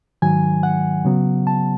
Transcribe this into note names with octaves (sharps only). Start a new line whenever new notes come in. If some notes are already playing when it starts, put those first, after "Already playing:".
G#2 D#3 F#3 G#5
F#5
C#3 F#3 B3
A5